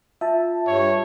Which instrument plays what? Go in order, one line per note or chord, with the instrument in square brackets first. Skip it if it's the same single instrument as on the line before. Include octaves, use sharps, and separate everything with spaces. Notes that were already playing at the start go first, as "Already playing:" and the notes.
[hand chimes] F4 [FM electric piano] E5 A5
[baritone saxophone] G2 [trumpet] C#5